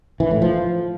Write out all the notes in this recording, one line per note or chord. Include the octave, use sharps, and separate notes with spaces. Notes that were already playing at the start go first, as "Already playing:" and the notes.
E3
A2
F3